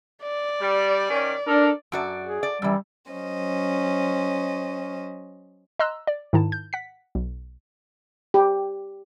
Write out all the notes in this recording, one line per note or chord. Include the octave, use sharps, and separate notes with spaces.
D5
G3
D#3 C#4
D4 A4 A#4
F#2 F#4 D5
G#4
D5
F#2 E3 G3
F#3 C#4 C5 D#5
D#5 A#5 C6 E6 F#6
D5
G#2 D#3 E4 A5
G6
F#5 B6
B1
G4